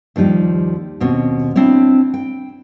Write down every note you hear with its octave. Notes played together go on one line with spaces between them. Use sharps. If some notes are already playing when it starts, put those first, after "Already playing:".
D#2 F3 G3 D#4 G4
D#2 B2 C4 C#4
C4 D4 E4 C#5
G5